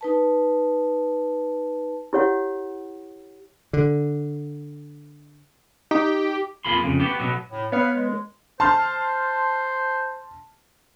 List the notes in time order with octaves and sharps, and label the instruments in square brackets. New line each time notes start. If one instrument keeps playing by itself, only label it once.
[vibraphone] D#4 B4 A5
[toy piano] E4 G4 C#5 F#5
[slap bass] D3
[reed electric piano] D#4 [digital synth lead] G4
[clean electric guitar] F2 A#3 F4 G#4 B5 C6
F2 C#3
B3 F#4 G4
B2 F#3 B3
[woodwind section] A2
[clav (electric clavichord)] B3 C#5 [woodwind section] B4 F5
[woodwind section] G#3
[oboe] C5 [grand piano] A5 C6 F6